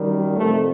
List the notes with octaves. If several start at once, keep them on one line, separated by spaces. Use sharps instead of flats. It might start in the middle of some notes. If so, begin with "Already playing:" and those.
Already playing: F#2 D#3 G3
F2 C3 F3 A3